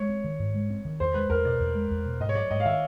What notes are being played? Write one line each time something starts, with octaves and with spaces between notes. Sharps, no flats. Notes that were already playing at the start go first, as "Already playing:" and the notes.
Already playing: G#3 C#5
C4
D#3
G#2
G#3
C4
D#3
E2 C5
G#3 B4
E2 A#4
B2 D5
E2
G#3
E2
B2
G#2 D#5
C#5
F#3 D5
G#2 D#5
F5
D#3 E5